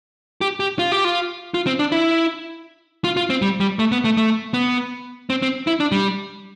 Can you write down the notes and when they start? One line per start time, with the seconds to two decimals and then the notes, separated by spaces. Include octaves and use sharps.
0.41 G4
0.60 G4
0.79 F4
0.92 G4
1.05 F4
1.54 F4
1.67 C4
1.79 D4
1.92 E4
3.04 F4
3.17 F4
3.30 C4
3.42 G3
3.60 G3
3.79 A3
3.92 B3
4.04 A3
4.17 A3
4.54 B3
5.30 C4
5.42 C4
5.67 E4
5.80 D4
5.92 G3